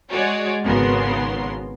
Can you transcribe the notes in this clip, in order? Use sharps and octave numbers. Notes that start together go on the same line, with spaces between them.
G#3 F#4 G#4 C#5 D5
G#1 C#3 B3 F#4 A#4 C6